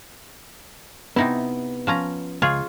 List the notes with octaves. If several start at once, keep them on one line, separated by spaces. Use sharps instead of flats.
C3 B3 D#4 E4
F3 C#4 A#5
C#2 F4 G#4 C#5